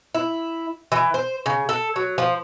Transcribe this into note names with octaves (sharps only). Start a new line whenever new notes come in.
E4
E3
C5
C#3
A4
F#3
F3